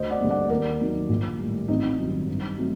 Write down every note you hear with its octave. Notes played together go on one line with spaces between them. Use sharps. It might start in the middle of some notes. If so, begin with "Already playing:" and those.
Already playing: D2 C5 D#5
D5 F#5
D3 G3 A#3
D5 F#5
D#2 A#4 D5
D#3 F#3 A#3
A#1
A2 G3
A1 C4 D#4
G2 D#3 F#3 C4
G2
F#3 A3 C4